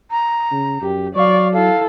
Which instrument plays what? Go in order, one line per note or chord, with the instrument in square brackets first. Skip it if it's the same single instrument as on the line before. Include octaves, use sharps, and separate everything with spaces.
[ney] A#5
[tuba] C#3
[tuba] F#2 [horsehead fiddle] G4
[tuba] F#3 [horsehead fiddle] D5 F5 [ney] C#6
[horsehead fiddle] E4 A4 [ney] F5